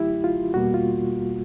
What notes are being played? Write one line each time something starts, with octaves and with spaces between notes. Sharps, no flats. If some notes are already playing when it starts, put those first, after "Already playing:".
Already playing: F#2 D3 F#3 A3 E4 G4
F4
E2 B2 G3 A#3 F#4
F4